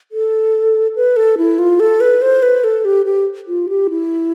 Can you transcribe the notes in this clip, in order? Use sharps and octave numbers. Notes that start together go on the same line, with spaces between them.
A4
B4
A4
E4
F4
A4
B4
C5
B4
A4
G4
G4
F4
G4
E4